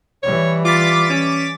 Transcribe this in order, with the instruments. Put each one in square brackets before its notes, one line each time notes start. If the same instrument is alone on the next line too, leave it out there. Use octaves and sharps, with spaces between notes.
[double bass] E3 G3 [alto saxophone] C#5
[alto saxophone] F4 [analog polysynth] D6 A6 B6
[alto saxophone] C#4